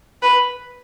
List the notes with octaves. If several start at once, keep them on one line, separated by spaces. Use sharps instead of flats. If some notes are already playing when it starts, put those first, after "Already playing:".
B4